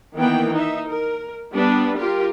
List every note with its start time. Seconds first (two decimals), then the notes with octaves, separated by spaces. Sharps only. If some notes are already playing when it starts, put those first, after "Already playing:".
0.16 D#3 E3 A#3 B3 G5
0.54 D#4 E5
0.88 A#4
1.52 G3 B3 D4 B4
1.98 F4 G4 A#4